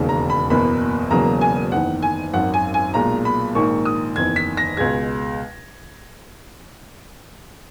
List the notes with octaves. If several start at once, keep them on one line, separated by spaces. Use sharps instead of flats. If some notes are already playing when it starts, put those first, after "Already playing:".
Already playing: E1 D#2 C#3
A#5
B5
F#1 E2 B2 A#3 B5
E1 E2 C#3 F#3 A#3 A#5
G#5
F#1 E2 D#3 F#5
G#5
G#1 F#2 D#3 F#5
G#5
G#5
B1 A#2 G#3 A#5
B5
A#1 G#2 D#3 A#3 C#6
D#6
F#1 E2 D#3 G#6
B6
A#6
C#2 B2 G#3 G#6